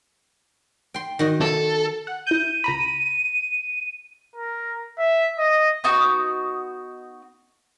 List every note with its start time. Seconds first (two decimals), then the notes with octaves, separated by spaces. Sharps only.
0.94 G5 C6
1.19 D#3 F#4 D#5
1.41 A4
2.07 F#5
2.27 E4 G6 D#7
2.64 C#2 A#5 B5
4.36 A#4
4.99 E5
5.39 D#5
5.84 B3 D#4 F#4 D6